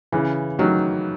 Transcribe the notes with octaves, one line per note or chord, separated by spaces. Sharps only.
C#3 E3
D#3 F#3